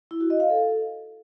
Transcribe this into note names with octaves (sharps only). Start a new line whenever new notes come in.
E4
F#4
D#5
F5
A4